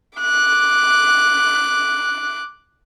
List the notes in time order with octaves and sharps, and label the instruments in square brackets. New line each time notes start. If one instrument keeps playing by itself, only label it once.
[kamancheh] D6 F#6